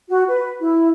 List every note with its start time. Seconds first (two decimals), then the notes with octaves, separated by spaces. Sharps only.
0.09 F#4
0.28 B4
0.60 E4